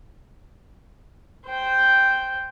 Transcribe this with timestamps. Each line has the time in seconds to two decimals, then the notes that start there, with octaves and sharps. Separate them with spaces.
1.46 C5 G5